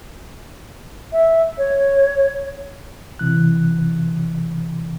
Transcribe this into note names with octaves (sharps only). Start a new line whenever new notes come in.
E5
C#5
C3 E3 F#6